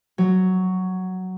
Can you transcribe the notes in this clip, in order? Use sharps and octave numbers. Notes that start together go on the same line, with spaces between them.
F#3